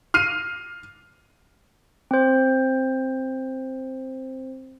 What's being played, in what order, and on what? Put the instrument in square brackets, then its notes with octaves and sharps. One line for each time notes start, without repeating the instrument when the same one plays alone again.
[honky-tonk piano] F6 C7 D#7
[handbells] C4 C5